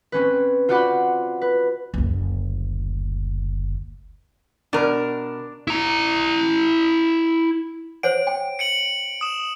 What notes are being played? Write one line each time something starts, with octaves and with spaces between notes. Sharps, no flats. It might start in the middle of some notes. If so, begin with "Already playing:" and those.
C4 C#4 B4
F4 F#4 C5 D5 F#5 B5
B4
F#1 D2
B2 D4 A#4
E4 A#5
C5 C#5 F#5 D7
G5
C#7 D7 F#7
D#6 E7